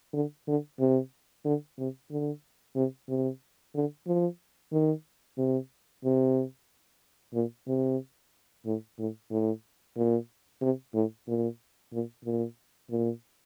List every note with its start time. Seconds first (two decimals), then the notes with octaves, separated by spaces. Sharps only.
0.14 D3
0.47 D3
0.79 C3
1.45 D3
1.78 C3
2.11 D3
2.75 C3
3.09 C3
3.75 D3
4.07 F3
4.72 D#3
5.37 C3
6.04 C3
7.34 A#2
7.67 C3
8.65 A2
8.99 A2
9.31 A2
9.97 A#2
10.62 C3
10.94 A2
11.28 A#2
11.93 A#2
12.25 A#2
12.91 A#2